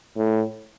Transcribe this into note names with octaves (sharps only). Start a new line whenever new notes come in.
A2